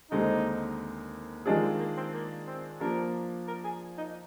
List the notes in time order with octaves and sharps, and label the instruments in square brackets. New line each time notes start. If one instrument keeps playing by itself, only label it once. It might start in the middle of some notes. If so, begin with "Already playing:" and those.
[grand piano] D#2 D3 G#3 C4 [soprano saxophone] D#4
[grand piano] D#3 G#3 D4 F4 G#4 [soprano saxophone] D#4
[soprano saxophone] C4
A#3
C4
A#3
C4
[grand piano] F3 A#3 D4 [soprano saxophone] A#4
[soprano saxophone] A#4
G#4
D#4